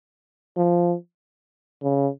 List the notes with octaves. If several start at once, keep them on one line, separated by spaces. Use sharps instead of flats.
F3
C#3